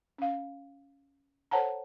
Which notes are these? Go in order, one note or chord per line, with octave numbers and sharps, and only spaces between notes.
C#4 F5
A4 C5 C#5 F#5 A5 A#5